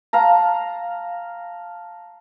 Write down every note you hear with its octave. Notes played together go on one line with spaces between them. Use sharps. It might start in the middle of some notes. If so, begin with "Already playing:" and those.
F5 A5 A#5